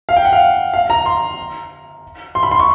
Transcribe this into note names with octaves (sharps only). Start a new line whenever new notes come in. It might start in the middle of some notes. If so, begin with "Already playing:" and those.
F5
G5
F#5
F5
F5
A#5
C6
C6
B5
C6
C#6